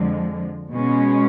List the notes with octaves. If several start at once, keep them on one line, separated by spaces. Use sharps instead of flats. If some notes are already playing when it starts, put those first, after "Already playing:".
Already playing: F2 D3 F3 G#3
B2 G#3 C#4